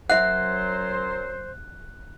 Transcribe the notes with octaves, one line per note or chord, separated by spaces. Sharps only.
F#2 F#3 C5 E5 F#5 F#6